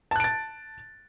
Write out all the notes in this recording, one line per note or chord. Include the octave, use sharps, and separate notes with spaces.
A5 F#6 A6 D7